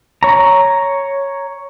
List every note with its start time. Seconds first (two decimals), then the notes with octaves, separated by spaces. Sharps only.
0.23 C#5 A#5